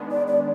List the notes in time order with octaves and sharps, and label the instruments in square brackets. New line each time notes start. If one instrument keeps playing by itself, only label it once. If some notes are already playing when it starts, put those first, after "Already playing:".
Already playing: [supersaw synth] D#3 G#3 B3 D4
[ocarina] D5
D5